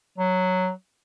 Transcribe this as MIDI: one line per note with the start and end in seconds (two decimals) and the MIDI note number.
0.18 0.70 54